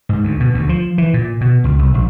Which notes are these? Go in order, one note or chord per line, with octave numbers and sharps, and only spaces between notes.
G#2
D2
B2
D2
F3
E3
A#2
B2
C#2
C2
A#1